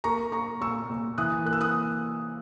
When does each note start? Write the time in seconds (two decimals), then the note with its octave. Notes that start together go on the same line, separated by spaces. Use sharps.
0.04 A#3 A#5 C#6
0.32 A#3 A#5 C#6
0.61 A#2 C#6 E6
0.90 A#2
1.18 E3 D#6 F#6
1.45 A#3 F#6
1.53 E6
1.61 D#6 F#6